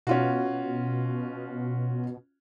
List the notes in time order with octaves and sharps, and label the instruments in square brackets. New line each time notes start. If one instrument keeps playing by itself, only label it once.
[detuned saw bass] B2 [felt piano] C#4 F4 F#4